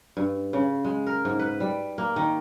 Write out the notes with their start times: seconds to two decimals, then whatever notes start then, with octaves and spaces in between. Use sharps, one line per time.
0.17 G2
0.53 C#3
0.85 G#3
1.06 A#4
1.25 G#2
1.39 B4
1.60 G3
1.98 A#3
2.16 D#3